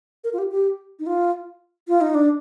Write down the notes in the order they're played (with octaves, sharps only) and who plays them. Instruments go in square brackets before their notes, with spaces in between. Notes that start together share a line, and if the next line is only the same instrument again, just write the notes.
[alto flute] A#4
F4
G4
G4
D#4
F4
F4
D#4
D4